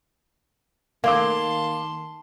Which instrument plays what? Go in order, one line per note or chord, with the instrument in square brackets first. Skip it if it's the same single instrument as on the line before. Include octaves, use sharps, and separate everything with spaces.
[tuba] D#3 [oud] A#3 [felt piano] F5 D6 [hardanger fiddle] A5 C6